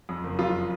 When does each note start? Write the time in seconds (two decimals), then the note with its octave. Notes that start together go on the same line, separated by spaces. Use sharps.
0.09 F2
0.24 F#1
0.39 F2 F4